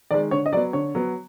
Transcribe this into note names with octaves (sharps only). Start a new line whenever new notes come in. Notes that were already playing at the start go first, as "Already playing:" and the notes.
D#3 G#3 D5
D3 C#5
D#5
F#3 B3 D5
D3 C#5
F#3 B3